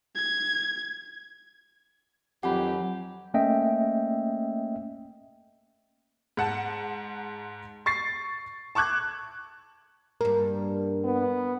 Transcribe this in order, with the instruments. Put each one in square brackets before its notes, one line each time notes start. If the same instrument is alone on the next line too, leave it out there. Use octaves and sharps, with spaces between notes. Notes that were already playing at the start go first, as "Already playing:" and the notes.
[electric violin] G#6
[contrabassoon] F2 [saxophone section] D#3 G4 [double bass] F#3 [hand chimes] F#5 G#5 B5
[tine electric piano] A3 A#3 C#4 D#5 E5 G5
[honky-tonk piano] G#2 F#5 A5
C#6 A6 C7
A5 C#6 D6 F#6 G#6
[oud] G2 A#3 [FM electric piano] A#4
[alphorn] B3